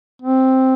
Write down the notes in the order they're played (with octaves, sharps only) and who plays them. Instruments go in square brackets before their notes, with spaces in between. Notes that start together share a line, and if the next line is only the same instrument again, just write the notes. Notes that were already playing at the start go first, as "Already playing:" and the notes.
[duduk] C4